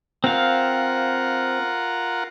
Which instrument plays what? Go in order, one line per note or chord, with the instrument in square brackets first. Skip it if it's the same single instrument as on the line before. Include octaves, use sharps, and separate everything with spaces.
[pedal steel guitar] C4 F5 [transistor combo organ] F4 A#4 F#5